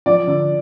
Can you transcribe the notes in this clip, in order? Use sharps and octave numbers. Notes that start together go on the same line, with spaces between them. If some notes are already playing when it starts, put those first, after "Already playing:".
F3 D5
D3